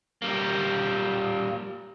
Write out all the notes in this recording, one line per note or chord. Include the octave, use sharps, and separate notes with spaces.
G3 A#3